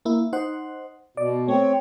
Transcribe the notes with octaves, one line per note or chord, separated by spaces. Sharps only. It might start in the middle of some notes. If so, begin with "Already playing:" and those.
A#3 E4
D#4 C5 F#5
B2 D5
A3 C4 C#5